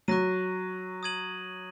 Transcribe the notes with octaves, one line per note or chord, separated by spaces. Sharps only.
F#3 C#6 F#6 A#6 D#7
D#6 G#6 D#7 F#7